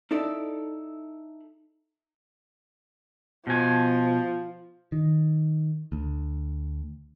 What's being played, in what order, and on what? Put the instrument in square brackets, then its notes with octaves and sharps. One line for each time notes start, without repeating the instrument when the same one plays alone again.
[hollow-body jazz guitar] D#4 E4 A4 D5
[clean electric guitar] B2 G#5 [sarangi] F3
[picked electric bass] D#3
D2